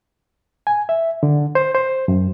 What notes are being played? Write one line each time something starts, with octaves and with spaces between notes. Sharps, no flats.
G#5
E5
D3
C5
C5
F#2